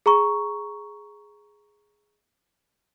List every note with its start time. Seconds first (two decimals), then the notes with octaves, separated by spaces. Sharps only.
0.06 G#4 A#5 C#6